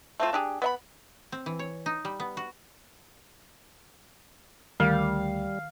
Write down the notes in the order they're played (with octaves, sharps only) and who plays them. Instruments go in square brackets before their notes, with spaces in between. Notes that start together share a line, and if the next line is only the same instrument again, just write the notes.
[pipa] A3 C4 F4
D4 G4 G#4
B3 D#5 B5
[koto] C4
E3
C#5
D#4
G3
B3
F#4
[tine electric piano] D2 [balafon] D#3 [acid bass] G3 [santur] F5